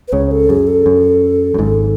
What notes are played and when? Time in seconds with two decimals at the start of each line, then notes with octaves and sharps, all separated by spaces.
0.08 B4
0.12 C#2 C#3 C#5
0.31 A4
0.49 F#2 G#4
0.67 A4
0.86 F#2
1.54 F#2
1.58 G#1 G#2